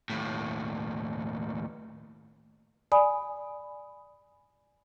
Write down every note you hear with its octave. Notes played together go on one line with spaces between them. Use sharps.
D#2 A2
D5 G#5 B5 D#6